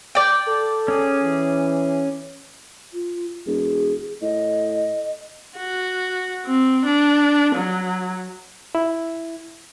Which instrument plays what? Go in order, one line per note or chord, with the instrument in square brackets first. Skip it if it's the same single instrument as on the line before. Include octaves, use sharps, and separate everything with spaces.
[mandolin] D5 G5
[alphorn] A4
[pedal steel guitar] C#4 G#4
[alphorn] E3
[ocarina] F4
[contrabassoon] E1 [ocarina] G#4
[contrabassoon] A2 [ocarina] D#5
[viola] F#4
C4
D4
F#3
[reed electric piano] E4